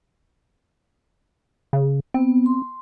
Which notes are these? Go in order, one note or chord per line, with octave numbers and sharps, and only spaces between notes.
C#3
B3 C4
C6